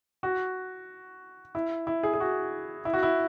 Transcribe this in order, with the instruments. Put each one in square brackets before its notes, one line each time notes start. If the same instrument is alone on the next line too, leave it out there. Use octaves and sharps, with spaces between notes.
[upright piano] F#4
E4
E4
G#4
G#4
F#4
E4
F#4
E4